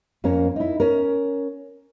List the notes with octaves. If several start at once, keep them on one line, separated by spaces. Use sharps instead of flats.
F2 A#3 C#4 A#4
D#4 E4
C#4 A#4